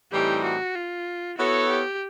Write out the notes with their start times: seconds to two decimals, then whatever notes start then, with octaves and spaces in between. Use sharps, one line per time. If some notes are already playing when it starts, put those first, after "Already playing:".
0.12 A2 E3 G3 C4 D#4 G4
0.44 F#4
0.75 F4
1.38 B3 E4 F#4 A4 C#5
1.69 G4